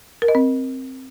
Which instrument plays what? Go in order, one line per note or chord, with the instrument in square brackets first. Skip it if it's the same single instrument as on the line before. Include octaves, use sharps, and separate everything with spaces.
[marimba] A#4
D#5
C4